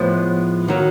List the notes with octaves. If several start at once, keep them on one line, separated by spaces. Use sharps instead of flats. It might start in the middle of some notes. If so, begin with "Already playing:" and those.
Already playing: A2 F3 G#3 B3
D#3 F#3